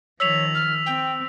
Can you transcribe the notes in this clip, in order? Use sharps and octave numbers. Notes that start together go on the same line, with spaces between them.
D#3 F3 C#5 E6 B6 F7
F6
C4 G5